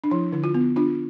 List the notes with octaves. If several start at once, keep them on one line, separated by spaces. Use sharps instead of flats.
D4
F3 E4
D3 E4
F4
B3
D4 F4